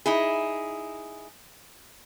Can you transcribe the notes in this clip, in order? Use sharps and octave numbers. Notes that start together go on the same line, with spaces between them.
D#4 E4 G#4